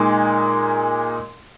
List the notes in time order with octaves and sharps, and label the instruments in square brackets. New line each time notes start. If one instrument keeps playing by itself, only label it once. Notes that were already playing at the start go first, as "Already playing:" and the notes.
Already playing: [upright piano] A#2 G#3 D#4